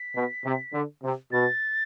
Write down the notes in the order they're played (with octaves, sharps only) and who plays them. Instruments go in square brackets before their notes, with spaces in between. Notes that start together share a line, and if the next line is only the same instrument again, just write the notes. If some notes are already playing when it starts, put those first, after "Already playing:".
Already playing: [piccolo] B6
[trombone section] B2
C3
D3
C3
[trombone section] B2 [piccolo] A6